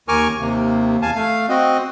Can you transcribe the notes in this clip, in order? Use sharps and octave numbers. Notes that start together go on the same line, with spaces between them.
D#2 A#4 G#5 C#6 D6 F6
D#2 C3 A#3
E2 F5 G#5 A5
A3 F5
C4 F#4 D#5